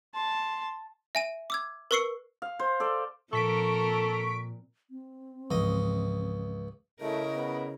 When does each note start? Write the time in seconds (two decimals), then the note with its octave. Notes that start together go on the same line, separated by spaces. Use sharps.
0.15 A5 C6
1.15 E5 G#5 D#7
1.50 D6 E6 G#6
1.91 A#4 B4 C#6 E6 C7 C#7
2.42 F5
2.59 C5
2.80 A4 D5
3.33 A#2 F3 C4 A4 A#4 C#6 B6 D7
4.91 C4
5.51 C#2 G#2 E3 F3 D#5
7.01 C#3 A3 E4 A#4 D#5
7.35 B3